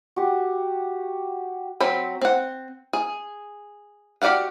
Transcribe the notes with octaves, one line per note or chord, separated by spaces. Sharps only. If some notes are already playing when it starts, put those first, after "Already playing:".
F#4 G4
F#3 C4 C5 B5
C4 F#5
G#4
F#4 G4 D5 F5 F#5